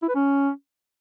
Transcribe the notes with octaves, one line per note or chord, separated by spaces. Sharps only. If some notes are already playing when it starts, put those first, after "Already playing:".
E4
B4
C#4